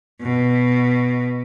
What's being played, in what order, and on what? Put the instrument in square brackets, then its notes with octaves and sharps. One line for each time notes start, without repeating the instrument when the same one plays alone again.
[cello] B2